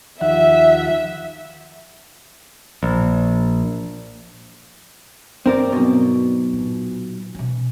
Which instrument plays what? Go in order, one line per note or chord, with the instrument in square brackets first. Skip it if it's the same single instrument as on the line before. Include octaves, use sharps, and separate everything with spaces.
[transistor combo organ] D#2 F3 F#5 [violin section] E5
[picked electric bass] A#1
[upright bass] G2 [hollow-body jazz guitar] C4 A#4 D5
[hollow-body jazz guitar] B1 B2
[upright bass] A#2
B2 C#4